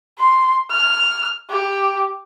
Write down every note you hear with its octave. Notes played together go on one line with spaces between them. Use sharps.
C6
F6
G4